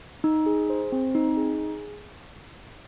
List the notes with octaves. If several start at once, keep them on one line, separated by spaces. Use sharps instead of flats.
D#4
G#4
C5
C4
D#4
G#4